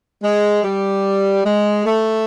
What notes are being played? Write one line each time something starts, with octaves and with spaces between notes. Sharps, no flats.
G#3
G3
G#3
A3